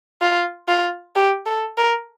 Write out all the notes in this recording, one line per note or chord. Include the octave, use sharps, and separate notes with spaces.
F4
F4
G4
A4
A#4